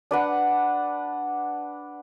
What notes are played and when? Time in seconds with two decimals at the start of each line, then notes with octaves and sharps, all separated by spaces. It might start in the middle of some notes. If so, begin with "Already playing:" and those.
0.11 D4 B4 F#5